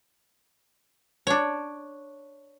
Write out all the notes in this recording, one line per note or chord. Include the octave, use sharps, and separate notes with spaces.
D4 C#5